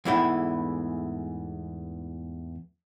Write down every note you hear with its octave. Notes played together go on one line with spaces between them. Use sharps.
E2 G#2 E3 A3 E4 G5